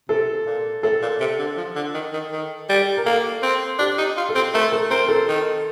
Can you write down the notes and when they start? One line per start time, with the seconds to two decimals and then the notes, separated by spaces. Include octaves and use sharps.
0.09 C3 A4
0.46 A#2
0.83 A2 A4
1.02 A#2
1.20 C3
1.39 D3
1.57 F3
1.75 D3
1.94 D#3
2.13 D#3
2.32 D#3
2.69 G3
2.97 A#4
3.05 A#3 A4
3.42 C4
3.79 D4 G4
3.98 D#4
4.17 F4
4.29 A4
4.35 C4
4.54 A3 A#4
4.72 A4
4.91 C4 A#4
5.08 A4
5.28 D#3